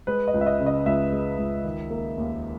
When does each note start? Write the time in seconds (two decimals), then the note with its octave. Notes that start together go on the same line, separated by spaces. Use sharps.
0.07 G#3 B4
0.28 D#5
0.34 C#2
0.41 E5
0.46 D#5
0.60 C#3
0.66 D#5
0.86 C#2 E5
1.12 G#3
1.38 C#2
1.64 D#3
1.90 A#3
2.18 D#2